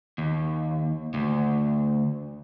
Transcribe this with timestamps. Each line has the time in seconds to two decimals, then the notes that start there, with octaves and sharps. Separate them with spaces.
0.18 D#2
1.14 D2